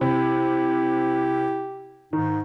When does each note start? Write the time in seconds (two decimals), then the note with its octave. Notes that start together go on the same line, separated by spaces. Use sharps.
0.01 C3 E4 G4
2.13 G#2 D#3 D#4